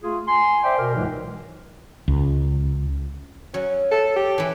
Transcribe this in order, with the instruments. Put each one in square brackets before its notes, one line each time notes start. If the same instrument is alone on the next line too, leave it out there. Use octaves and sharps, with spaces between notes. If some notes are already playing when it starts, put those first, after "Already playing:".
[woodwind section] A3 F4 G#4
G#5 C6
C5 D5 E5 G5
B2 A#4
C#2 G#2 E3 F#3
[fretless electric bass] C#2
[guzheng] F#3 [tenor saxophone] C#4
[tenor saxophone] A4
G4
[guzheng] E3 E4